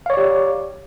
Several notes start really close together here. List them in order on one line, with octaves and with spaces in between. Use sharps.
F5 C#5 D5 G4